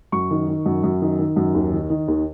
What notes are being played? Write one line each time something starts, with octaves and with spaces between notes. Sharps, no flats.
F#2 C#6
D#3
D#3
F#2
F#2
D#3
D#3
F#2
D#2
D#3
D#3
D#2